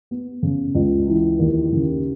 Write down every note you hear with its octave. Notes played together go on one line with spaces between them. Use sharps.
B3
C#3
C#2
E3
D#2
C#3